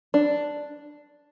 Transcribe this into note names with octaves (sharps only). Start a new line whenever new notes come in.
D4